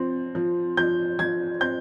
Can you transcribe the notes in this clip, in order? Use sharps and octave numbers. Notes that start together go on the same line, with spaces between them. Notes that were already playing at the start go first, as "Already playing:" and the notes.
Already playing: F3 C4
F3
F3 G6
F3 G#6
C4 G6